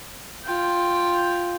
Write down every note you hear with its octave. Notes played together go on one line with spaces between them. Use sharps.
F4 G5